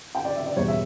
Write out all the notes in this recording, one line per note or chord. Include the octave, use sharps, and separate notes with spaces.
G5
D5
E5
D5
E2 B2 G3 C#5
E5